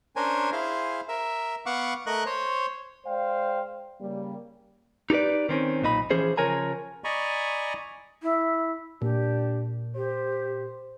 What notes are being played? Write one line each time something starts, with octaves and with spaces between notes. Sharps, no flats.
C#4 D4 A#4 C5 G#5
E4 G#4 C5 F5
A#4 E5
B3 F5 F#5 C#6 D6
A3 A#4 D#5 C#6 F#6
C5 C#5
G#3 C5 D5 F5 G5
C#3 G3 A#3
D#4 G4 A4 B4 D5
D#3 C4 C#4
B1 A#2 D#4 B5
E3 F3 C#4 G#4 C5
C#3 F3 A#4 C#5 G#5 A#5
D5 D#5 G#5 A#5 B5 C#6
E4
A#2 D4 G4
G4 C5